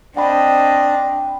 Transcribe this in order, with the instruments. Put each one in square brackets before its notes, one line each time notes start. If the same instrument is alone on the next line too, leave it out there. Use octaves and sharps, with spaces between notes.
[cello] C4 D#5 [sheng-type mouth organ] D4 [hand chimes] F#5 G5 B5